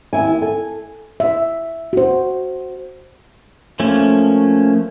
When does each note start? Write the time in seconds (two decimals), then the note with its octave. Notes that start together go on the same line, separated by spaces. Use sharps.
0.13 D#2 E4 G#5
0.41 A4 G#5
1.20 E5
1.93 F#4 C5
3.80 F3 A3 A#3 C#4